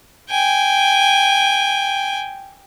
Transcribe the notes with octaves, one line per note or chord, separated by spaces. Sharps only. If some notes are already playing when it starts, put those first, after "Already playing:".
G5 G#5